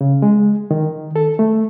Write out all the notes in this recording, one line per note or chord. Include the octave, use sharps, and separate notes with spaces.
C#3
G#3
D#3
A4
A3